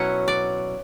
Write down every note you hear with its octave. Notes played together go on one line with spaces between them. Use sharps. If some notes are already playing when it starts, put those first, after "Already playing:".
Already playing: B2 F#3 C#4 E4 F#5
D5